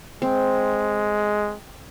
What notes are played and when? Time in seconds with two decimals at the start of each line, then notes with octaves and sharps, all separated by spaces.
0.22 G#3 C4